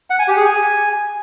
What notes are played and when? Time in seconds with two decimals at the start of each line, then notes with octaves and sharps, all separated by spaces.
0.10 F#5
0.19 G#5
0.28 G4
0.37 G#4
0.46 G#5